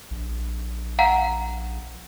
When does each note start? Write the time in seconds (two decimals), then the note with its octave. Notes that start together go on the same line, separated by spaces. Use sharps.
0.11 A#1
0.99 F5 F#5 A#5